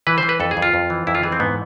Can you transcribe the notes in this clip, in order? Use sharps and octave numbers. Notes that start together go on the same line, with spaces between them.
E3 B4
C5
E3
B4
F2 A4
G#4
F2
F4
F2
E3
F2 E4
F4
E3 G#4
C4
G#2 B3